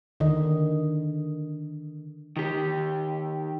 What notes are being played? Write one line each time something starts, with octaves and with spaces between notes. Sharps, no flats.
D3 D#3 D#5
D#3 G4